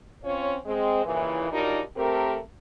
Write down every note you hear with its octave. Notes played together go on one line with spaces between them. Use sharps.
C4 C#4 F4 C#5
G#3 C4
D#2 A#2 C#3 E3
F#3 G3 D4 D#4 F4 A#4
A3 C4 G4 A4 A#4